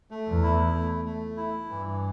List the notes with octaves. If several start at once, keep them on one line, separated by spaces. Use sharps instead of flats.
A3
E2
E4
A3
A3
E4
G2 E3